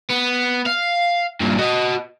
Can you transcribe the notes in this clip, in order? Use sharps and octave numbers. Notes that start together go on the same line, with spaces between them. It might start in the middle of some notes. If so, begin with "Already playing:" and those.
B3
F5
G2 A#2
F#4 D#5